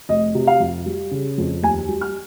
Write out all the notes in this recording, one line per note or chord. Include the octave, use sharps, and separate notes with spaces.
F1 D#5
C3
F5
F2
G3
C#3
F2
D#2 G#5
G3
F6